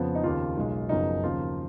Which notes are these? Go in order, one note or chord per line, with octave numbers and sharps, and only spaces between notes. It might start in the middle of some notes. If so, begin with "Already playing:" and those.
Already playing: F2 C#3 F3 B3
D#4
D#2 C#3 F3 F4
B1 B2 G#3
F#1 F#2 C#3 F3 B3 D#4
D#2 C#3 F3 A#3 F4